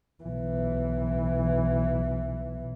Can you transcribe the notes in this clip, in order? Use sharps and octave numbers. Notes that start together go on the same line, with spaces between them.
B1 E3